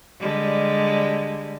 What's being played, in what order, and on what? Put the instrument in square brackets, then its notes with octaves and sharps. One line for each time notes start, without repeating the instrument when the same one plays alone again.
[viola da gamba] D3 G3 G#3